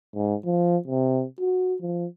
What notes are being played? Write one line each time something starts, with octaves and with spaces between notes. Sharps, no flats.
G#2
F3
C3
F#4
F3